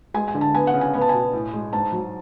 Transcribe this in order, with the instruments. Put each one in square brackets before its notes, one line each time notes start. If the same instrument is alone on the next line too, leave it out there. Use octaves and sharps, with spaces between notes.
[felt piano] G#3 G#5
G#5
D3
A5
B3 G#5
F#5
C#3
G#5
B3 G#5
A5
B2 G#5
A2
G#3
G#2 A5
F#3